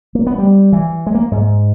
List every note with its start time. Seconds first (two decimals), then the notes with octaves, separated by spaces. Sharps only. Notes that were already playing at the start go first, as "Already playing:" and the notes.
0.15 A#3
0.27 B3
0.38 G3
0.72 E3
1.06 G#3
1.14 A#3
1.32 G#2